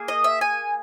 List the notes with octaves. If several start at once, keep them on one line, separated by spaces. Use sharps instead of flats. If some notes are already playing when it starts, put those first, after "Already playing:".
Already playing: A#3 G#4
D#5
E5
G#5